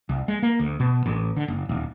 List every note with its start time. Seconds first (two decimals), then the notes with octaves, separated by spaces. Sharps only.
0.09 C2
0.28 G#3
0.43 A#3
0.60 D2
0.80 B2
1.06 A1
1.37 D3
1.48 F#1
1.69 D#1